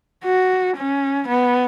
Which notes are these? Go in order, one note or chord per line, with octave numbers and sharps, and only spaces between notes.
F#4
C#4
B3